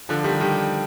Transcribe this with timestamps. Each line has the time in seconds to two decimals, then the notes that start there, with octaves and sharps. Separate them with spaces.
0.09 D3 F3
0.24 D#3 G3
0.40 D#3 G3